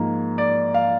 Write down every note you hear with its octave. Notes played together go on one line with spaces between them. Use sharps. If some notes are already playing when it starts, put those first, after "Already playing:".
Already playing: G#2 F3 A#3
D5
F5